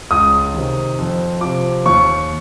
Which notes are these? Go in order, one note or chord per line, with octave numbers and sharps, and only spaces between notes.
C#2 D#6
C3 D#3
F2
C3 F3 D6
D#2 C#6